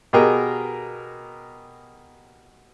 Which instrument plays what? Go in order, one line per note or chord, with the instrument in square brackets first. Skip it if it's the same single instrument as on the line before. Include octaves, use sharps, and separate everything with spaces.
[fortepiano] B2 G4 G#4 A#4